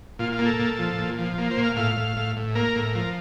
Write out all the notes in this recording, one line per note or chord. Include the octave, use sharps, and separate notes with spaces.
A#2 F4
F4
A#3
A4
A#2
F3
A#2
F3
A#3
C5
A#2
F5
A2 F5
A2
A2
A2
A#3 A#4
A2
F3